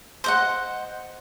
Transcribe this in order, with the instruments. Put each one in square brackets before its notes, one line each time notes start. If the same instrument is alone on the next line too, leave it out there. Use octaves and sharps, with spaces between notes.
[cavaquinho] C5 D#5 F#5